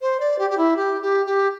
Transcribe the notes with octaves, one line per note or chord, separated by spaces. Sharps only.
C5
D5
G4
G4
E4
G4
G4
G4